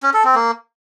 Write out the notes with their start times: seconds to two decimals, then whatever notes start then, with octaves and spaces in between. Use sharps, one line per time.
0.03 C#4
0.14 A4
0.25 C4
0.35 A#3